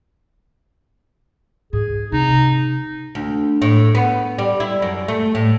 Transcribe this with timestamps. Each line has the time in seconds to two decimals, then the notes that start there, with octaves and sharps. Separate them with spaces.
1.73 G#2 G#4
2.12 C3 D#4
3.15 D2
3.62 A2
3.95 B3
4.39 G3
4.60 E4
4.82 F#2
5.08 A3
5.35 A2